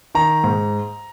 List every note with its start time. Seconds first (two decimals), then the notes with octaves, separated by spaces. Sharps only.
0.15 D#3 A#5
0.44 G#2